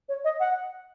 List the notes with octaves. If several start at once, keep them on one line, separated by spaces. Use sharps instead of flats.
C#5
D#5
F#5